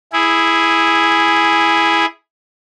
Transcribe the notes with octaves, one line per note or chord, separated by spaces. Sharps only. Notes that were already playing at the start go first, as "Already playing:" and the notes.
E4 G#4